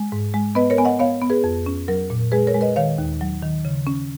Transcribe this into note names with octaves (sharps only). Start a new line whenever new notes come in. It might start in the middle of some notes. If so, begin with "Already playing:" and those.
Already playing: G#3
G#2
G#3
B3 B4 D#5
A#4 C#5
B3 G#5
D#5 F#5
B3 C#5 F5
B3
G#4 B4
F2
C#4
F#3 A#4
A#2
G#3 G#4 B4
A#4 C#5
G#3
B4 D#5
D#3 C#5 F5
D#2
F#3
D#3
C#3
C#4